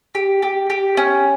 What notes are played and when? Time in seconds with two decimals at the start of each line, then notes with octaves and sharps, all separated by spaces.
0.15 G4
0.42 G4
0.70 G4
0.97 C#4